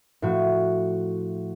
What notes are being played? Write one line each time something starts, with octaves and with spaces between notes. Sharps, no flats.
A2 F3 F#4